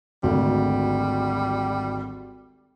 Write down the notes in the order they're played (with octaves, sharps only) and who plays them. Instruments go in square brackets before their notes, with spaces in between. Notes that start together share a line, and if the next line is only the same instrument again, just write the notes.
[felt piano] G#1 D2 [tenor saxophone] G3